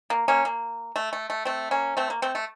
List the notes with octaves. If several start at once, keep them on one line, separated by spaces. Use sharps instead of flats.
A#3
A#3 C#4
A#3
A3
A3
A3
A3 C4
A#3 C#4
A3 C4
A#3
A3 C4
A3